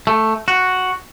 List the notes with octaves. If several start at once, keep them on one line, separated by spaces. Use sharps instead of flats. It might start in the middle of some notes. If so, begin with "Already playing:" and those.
A3
F#4